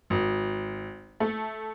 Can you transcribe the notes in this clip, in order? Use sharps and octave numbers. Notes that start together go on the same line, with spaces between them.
G#1
A3